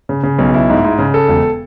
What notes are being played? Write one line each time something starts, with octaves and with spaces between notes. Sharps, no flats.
C#3
C#3
B1
E4
G#2
G#2
C#3
A4
E1